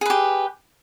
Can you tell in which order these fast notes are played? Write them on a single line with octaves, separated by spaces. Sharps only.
G#4 B4 G4